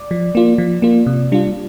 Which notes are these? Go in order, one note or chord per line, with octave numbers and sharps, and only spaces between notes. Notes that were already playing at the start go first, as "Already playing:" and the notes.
Already playing: D5
F3
A#3 F4
F3
A#3 F4
C3
G3 D4 F4